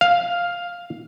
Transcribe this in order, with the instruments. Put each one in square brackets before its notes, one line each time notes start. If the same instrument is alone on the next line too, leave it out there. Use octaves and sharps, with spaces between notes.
[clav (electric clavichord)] F5